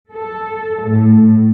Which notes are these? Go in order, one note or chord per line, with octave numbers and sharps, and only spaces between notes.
A4
A2